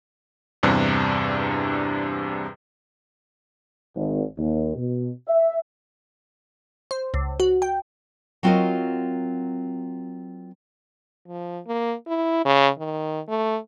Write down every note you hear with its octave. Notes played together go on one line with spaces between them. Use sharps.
E2 G2 C3 D4
G#1
D#2
B2
E5
C5
C#2
F#4
G5
F#3 C4 F4 F#4 A#4 D#5
F3
A#3
E4
C#3
D#3
A3